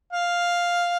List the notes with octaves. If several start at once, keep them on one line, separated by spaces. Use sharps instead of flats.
F5